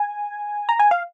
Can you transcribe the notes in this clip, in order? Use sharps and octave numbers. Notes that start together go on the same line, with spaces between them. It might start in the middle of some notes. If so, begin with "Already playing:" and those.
Already playing: G#5
A#5
G#5
F5